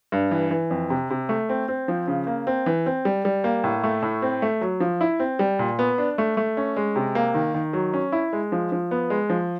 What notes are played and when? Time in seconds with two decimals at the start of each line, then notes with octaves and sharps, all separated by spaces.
0.12 G2
0.31 E3
0.51 E3
0.71 F2
0.90 C3
1.10 C3
1.29 A3
1.49 C4
1.68 C4
1.88 F3
2.08 C#3
2.27 A#3
2.47 C4
2.66 E3
2.86 C4
3.05 G3
3.25 G3
3.44 A#3
3.64 A2
3.84 A3
4.02 A2
4.22 C4
4.42 A3
4.61 F#3
4.80 F3
5.01 E4
5.20 C4
5.39 G3
5.59 A#2
5.79 B3
5.98 D4
6.18 A3
6.37 A3
6.57 C#4
6.77 G#3
6.96 C3
7.15 A#3
7.34 D#3
7.54 D#3
7.73 F#3
7.94 C#4
8.12 E4
8.33 G#3
8.52 F3
8.72 F3
8.91 B3
9.10 G#3
9.30 F3